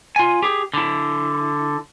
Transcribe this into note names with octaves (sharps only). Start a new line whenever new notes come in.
F4 G#5
G4 G#4
D3 E4